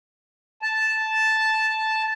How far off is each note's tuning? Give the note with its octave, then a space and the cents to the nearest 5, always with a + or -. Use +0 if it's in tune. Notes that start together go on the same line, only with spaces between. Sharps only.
A5 -5